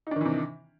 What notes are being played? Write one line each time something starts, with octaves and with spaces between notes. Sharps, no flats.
C3 D#3 E3 D4 D#4